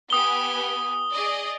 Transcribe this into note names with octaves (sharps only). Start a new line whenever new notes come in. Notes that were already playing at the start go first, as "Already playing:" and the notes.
B3 G4 G#5 D#6 G7
G#4 D5 D#5